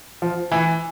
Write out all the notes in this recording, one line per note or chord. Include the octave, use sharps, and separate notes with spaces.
F3
E3